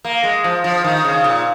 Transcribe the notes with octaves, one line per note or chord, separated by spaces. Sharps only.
A#3
G#3
F3
F3
D#3
C#3
A#2